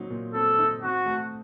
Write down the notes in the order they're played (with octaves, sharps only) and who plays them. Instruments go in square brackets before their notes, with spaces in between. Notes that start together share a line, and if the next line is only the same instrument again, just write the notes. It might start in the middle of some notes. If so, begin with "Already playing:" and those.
Already playing: [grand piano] A#2 F#3 C4 D#4
A#2
[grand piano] C4 [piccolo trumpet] A4
[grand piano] D#4
[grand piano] C4 [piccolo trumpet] F#4
[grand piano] A3